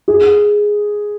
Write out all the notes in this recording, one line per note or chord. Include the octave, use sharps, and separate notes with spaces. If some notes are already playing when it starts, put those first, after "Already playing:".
G#4